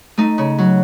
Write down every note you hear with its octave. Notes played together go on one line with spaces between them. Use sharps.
A3 D#4
C#3
F#3